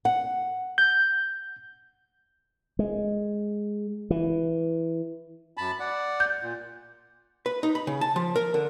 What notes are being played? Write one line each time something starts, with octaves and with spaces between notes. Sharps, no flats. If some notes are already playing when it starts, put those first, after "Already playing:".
F#5
G6
G#3
E3
F#2 A5 B5
D5 F#5
G6
A#2
B4
D#4
B5
C#3
A5
F3
A#4
D3